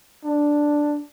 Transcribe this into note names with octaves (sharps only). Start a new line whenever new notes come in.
D4